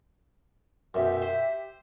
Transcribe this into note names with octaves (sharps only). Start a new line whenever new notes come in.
B1 F#2 G4 E5
C5